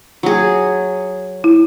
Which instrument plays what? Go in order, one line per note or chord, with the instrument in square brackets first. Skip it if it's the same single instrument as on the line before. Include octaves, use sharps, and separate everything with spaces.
[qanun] F#3 G#4
[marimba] E4